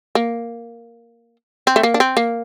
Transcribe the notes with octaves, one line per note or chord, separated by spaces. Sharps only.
A#3
C4
A3
A#3
D4
C4
A#3